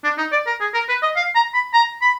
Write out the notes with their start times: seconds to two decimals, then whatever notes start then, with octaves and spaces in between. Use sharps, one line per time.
0.04 D4
0.18 D#4
0.32 D5
0.47 A#4
0.61 G#4
0.74 A#4
0.89 B4
1.02 D#5
1.16 F5
1.35 A#5
1.54 B5
1.73 A#5
2.02 B5